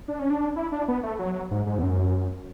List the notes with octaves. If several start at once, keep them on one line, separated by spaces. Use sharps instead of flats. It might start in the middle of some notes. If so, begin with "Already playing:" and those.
D4
C#4
D4
E4
D4
B3
A3
F#3
G#2
G#2
E2
F#2